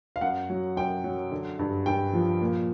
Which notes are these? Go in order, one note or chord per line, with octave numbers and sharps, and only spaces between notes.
F5
F#2 F#5
F#3
F#2 G5
F#3
D3
G2
G2 G5
F3
A#2